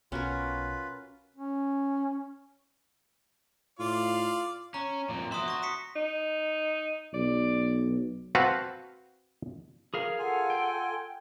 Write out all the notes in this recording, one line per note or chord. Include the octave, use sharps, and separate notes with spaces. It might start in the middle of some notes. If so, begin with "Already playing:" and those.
B1 C#4 F4 F#4 A#4 B4
C#4
A2 F4 D5 F5
C#4 A#5
F2 A#2
F#4 E5 C6 D#6
C#6 A#6
D#6 B6 C#7
D#4
B1 D5
C4 F#4 B4 F5 F#5 A5
G#4 A#4 F5
F4 A4 F#5 G#5
G5